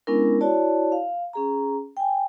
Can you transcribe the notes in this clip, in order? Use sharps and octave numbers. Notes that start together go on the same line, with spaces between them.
G#3 B3 C#4 D4 E4 A#4
E4 F#4 C#5 D5 A5
F5
C#4 G#4 A#5
G5 G#5